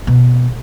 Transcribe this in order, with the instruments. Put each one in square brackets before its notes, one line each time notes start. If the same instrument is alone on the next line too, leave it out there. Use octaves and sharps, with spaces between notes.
[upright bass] B2